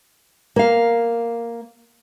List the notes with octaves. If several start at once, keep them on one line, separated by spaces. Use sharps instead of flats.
A#3 F5